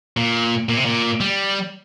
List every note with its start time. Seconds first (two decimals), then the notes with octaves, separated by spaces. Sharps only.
0.17 A#2
0.69 A#2
0.77 C3
0.86 A#2
1.20 G3